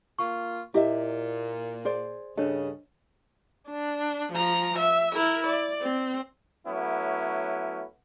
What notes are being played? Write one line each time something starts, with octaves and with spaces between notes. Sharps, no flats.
A#3 F4 C#6
A#2 E4 G4 D#5 E5
G#4 C5 D5
G2 C#3 D4 A4 C#5 D#5
D4
F3 A#5
E5
E4 A#4
D5
C4
F#3 A3 B3 C#4 E4